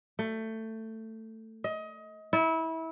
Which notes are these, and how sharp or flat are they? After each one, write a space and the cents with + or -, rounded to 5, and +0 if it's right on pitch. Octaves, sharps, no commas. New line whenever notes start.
A3 +15
D#5 +25
E4 -25